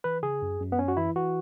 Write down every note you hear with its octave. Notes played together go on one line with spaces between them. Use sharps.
E3 B4
C#3 G#4
F#2
F#2
B3
F#2 C#4
F#4
E3 E4
E3 F#4